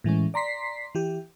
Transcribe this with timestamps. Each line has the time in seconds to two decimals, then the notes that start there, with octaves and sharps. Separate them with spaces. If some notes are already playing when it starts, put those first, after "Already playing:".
0.04 A2 E3 G#3 C#4
0.34 D5 A#5 C6 B6 C7
0.95 E3 G4